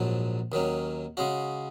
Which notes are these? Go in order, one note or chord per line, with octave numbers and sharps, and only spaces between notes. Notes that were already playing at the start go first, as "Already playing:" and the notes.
Already playing: A#1 G#2 F#3
D#2 D#3 F#3 C#4
C#3 G#3 C#4 F#4